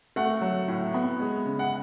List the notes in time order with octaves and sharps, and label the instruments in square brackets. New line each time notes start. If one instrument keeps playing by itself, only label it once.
[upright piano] A3 F#5
F#3
A2
B3
G#3
C#3
F#5